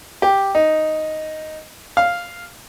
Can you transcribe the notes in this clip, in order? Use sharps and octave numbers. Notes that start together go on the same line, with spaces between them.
G4
D#4
F5